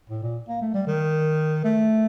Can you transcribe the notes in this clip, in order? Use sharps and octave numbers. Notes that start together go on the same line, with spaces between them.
A2
A#2
A#3
A3
G3
D#3
A3